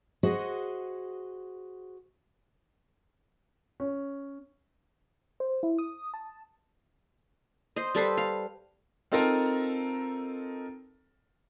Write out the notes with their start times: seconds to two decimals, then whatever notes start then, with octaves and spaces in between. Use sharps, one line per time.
0.23 F#4 G#4 C5 D#5 F#5
3.80 C#4
5.40 C5
5.63 E4
5.78 D#6
6.14 A5
7.76 C5 D#5
7.95 G3 A4 B4 C5
8.17 F5
9.12 C4 D#4 F4 A4 A#4 A#5